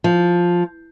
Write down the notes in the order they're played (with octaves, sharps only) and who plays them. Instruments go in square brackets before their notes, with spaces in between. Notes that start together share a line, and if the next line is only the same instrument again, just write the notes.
[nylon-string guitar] F3